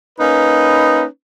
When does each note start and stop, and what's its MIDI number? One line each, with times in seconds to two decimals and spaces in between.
0.19 1.03 58
0.19 1.03 61
0.19 1.03 63
0.19 1.03 71